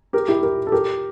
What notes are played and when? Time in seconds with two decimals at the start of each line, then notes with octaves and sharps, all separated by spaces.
0.13 G4 A#4
0.28 E4 G4
0.43 G4 A#4
0.67 A4
0.72 G4 A#4